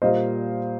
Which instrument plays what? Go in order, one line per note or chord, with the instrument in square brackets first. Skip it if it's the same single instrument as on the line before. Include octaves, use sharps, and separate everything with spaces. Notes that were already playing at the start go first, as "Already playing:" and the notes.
[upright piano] A#2 G3 A#3 F4 C5 D#5